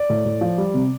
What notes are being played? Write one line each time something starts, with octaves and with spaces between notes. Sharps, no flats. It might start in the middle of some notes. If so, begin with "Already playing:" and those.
Already playing: D5
A2
A2
F3
G3
C3